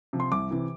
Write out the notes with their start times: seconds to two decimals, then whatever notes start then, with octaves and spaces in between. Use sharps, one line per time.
0.13 C3 F3
0.20 C6
0.32 C2 D6
0.51 C3 E3